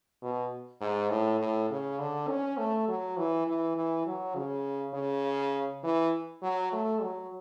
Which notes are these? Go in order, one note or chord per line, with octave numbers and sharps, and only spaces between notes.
B2
G#2
A2
A2
C#3
D3
C#4
A3
F#3
E3
E3
E3
F#3
C#3
C#3
E3
F#3
A3
F#3